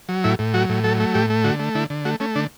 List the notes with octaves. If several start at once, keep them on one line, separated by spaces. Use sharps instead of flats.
F#3
A2 E4
A2
F#3 F#4
A2
F#3 A4
A3
A2 G4
A3
D3 F#4
A3
D3 E4
D3
A3 F#4
A3 C#4
D3 D4